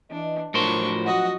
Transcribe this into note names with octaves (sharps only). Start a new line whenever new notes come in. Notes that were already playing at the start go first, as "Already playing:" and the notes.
E3 D4 D#5
A2 F3 F#3 D4 A#4 C5 C#6
F#4 D#5 F#5